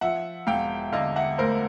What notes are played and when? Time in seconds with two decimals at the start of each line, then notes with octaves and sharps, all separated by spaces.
0.01 F3 E5 F#5
0.47 E1 F5 G5
0.92 D3 D#5 F5
1.16 E5 F#5
1.38 D2 A#4 C5